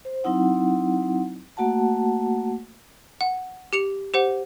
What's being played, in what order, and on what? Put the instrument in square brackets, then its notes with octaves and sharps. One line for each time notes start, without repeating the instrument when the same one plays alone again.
[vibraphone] C5
F#3 C4 D#4 E4 F#5
A3 A#3 F#4 F#5 A5
[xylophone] F#5
G4 C#7 F7
G4 C5 F#5